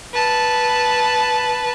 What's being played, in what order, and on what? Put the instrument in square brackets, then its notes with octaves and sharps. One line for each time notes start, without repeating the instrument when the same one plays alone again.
[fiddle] B4 A5